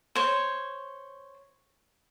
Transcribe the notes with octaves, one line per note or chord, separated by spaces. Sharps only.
C5 C#5